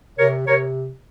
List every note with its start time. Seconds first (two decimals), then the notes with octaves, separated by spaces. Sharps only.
0.18 C3 A#4 C#5
0.47 C3 A#4 C#5